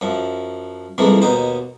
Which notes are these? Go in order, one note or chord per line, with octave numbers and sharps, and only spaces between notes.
F#2 F3
C2 F2 E3 F3 G#3 A#3
D#2 B2 D#4 C5